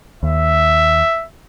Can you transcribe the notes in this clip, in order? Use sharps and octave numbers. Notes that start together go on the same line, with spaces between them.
D#2 E5